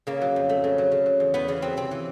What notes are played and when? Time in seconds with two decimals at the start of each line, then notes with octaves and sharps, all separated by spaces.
0.07 C#3 A#3
0.22 F#3
0.36 F2
0.49 A3
0.64 C#3
0.78 F#3
0.91 C#3
1.06 F#3
1.20 E2
1.34 E2 B3
1.48 C#3 B3
1.62 F#3 C4
1.77 C3 C4
1.91 E3